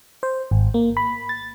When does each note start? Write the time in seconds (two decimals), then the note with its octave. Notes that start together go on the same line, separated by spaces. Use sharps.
0.23 C5
0.51 G#1
0.74 A#3
0.97 B5
1.29 A6